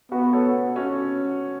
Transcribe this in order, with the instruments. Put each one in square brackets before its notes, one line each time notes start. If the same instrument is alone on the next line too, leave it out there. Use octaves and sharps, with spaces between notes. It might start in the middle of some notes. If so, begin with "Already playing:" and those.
[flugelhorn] B3 [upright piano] F#4 B4
[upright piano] A4 C#5
C#4 F#4